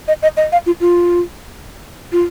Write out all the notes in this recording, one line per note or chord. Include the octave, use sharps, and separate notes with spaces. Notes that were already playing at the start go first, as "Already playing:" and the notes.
D#5
D#5
D#5
F5
F4
F4
F4